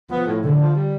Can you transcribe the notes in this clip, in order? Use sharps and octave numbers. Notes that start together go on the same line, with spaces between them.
F3 B3
A2
A2 D3
F3
G3